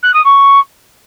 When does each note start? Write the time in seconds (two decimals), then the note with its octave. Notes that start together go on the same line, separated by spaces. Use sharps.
0.03 F#6
0.14 D#6
0.25 C#6